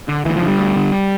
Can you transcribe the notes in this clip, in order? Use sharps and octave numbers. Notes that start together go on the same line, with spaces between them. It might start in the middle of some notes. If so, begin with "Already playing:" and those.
D3
D2 E3
F3
D3
G3
D2
D3